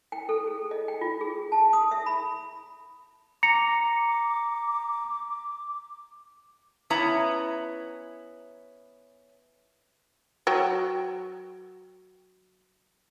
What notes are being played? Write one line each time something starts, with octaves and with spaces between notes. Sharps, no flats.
G5
A4
G#4
D#5
G5
F4
G#4
A5
D#6
E5
B5
A#5 D6 C#7
B3 C#4 E4 A#5
F#3 G5